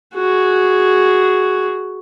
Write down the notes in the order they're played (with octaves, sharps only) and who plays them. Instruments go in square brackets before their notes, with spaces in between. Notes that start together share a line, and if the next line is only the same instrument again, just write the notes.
[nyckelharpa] F#4 G#4